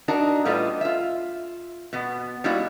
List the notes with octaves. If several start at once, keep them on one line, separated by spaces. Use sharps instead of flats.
D4 D#4 F#4 A#4
A2 G3 B3 F4 A4 D#5
F4 E5
B2 B3
G3 A#3 D#4 E4 F#4